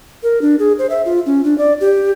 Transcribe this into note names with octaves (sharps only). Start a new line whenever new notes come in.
A#4
D4
G#4
C5
E5
F4
C#4
D4
D5
G4